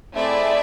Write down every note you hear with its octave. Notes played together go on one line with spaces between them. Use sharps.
A3 C4 E4 G#4 D5 E5